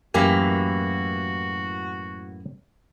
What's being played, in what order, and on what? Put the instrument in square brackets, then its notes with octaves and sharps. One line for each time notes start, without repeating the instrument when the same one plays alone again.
[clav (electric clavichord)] F#2 G4 G#5 [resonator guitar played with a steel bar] A2 E3 A#3 [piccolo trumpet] F#4